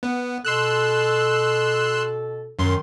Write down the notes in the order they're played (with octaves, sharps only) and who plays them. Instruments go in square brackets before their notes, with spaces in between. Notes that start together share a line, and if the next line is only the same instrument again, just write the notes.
[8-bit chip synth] B3
[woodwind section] B2 A4 [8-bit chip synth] C6 E6 F#6
[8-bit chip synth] F#2 C6 [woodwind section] D#3